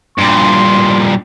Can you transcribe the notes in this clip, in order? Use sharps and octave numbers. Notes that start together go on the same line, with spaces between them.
G2 A#2 C6